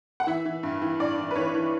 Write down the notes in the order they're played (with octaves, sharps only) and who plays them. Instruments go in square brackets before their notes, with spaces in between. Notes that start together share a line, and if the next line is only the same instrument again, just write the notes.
[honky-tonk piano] F#5
E3 E5
E3
G2
E3
G2 D5
E3
B4
E3 C#5
E3